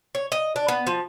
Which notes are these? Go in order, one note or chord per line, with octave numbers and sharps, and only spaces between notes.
C#5
D#5
D4
B3
F3